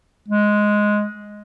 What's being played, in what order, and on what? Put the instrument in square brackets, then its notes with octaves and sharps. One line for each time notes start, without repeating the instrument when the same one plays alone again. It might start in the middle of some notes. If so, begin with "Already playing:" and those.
[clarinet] G#3